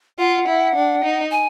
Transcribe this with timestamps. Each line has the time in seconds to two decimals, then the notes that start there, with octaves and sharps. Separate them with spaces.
0.19 F4 F#5
0.47 E4
0.75 D4
1.04 D#4
1.31 G#5